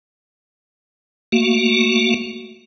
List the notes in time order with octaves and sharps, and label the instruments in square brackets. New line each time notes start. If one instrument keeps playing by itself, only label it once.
[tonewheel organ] A3 A#3 F#4